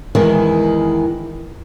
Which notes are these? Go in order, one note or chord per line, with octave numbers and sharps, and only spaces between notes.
E2 D#3 E3 G#3